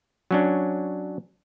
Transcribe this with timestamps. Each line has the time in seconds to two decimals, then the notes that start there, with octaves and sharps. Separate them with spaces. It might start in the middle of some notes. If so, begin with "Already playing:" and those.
0.31 F#3 C#4 D4